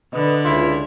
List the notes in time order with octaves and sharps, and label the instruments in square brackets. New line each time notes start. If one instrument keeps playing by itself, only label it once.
[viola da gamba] D3 [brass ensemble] B4 D#5
[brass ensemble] C#2 [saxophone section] E4 F4 E5